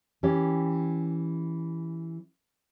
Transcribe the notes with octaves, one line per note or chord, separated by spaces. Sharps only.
E3 C#4 G4